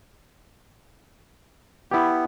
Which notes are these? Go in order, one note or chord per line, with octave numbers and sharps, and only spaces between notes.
B3 E4 G4